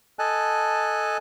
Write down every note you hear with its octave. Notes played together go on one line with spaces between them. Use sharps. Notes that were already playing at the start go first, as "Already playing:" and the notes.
A4 D#5 G#5 A5 F#6